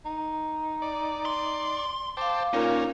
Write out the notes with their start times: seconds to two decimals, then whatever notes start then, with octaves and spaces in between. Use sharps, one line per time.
0.05 D#4
0.82 D5
1.25 C6
2.17 C5 F5 G5 A5 D6
2.54 A#2 C#4 D#4 A#4